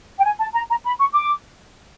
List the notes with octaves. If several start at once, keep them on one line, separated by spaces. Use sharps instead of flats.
G5
G#5
A5
A#5
A#5
B5
C#6
D6